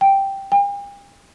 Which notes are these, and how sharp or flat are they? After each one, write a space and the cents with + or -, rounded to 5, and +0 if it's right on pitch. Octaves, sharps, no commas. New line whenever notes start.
G5 +0
G5 +45